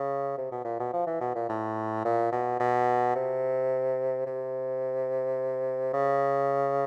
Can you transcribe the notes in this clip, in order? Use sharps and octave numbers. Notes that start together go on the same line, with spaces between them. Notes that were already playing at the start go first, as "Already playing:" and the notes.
Already playing: C#3
C3
B2
A#2
B2
F3
E3
B2
A#2
A2
A#2
B2
B2
C3
C3
C#3